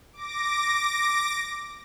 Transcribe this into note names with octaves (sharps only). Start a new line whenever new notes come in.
D6 A#6